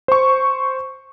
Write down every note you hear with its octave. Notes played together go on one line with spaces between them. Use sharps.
C5 C#6